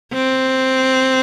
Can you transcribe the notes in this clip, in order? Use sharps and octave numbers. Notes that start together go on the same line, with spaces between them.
C4